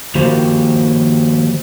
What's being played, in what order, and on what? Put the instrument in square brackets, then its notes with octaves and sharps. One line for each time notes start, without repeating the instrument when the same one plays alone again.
[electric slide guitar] D#3 F3 A#3 F#4 G4 C5